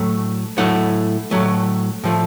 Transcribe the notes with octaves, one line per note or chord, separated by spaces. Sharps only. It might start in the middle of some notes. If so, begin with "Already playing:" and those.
Already playing: A2 F#3 A3
A2 F#3 A3 F#5
A2 F#3 A3
A2 F3 A3